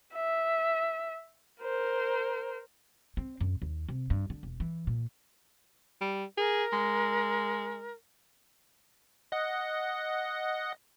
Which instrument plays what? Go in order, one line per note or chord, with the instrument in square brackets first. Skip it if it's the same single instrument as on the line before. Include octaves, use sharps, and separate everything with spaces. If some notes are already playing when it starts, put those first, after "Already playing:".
[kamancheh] E5
A#4 C5
[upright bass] C4
F#2
D#2
C3
G2
D3
E1
E3
A#2
[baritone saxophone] G3
[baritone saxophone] G#4 [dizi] A#4
[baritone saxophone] G#3
[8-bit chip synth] D#5 F#5